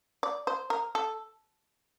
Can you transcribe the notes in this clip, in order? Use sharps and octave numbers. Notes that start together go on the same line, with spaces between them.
D5
C5
A#4
A4